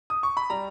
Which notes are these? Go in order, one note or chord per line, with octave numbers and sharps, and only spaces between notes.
D#6
C#6
B5
G3 A#5